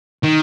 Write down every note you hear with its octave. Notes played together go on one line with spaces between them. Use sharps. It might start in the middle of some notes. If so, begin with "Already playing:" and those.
D#3